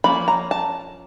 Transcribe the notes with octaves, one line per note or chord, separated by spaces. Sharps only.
F3 A#3 C#4 B5
A#5
A5